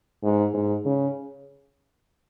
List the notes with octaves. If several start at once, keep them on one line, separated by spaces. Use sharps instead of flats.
G#2
G#2
C#3